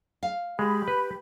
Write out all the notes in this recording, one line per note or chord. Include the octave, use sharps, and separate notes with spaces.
F5
G#3 G4 B5
B4